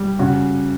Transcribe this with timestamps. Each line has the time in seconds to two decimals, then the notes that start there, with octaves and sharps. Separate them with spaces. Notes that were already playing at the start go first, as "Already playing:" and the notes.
Already playing: G3
0.19 C#3 F#4